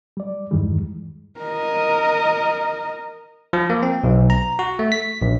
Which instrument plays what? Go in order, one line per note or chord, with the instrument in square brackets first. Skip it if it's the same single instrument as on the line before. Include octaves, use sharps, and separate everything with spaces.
[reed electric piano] G3 D5
E2 G2 D#3 E3 G3 G#3
[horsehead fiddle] A#4 D#5
[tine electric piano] F3
A#3
C4
B1
A#5
F#4
A3
B6
A#1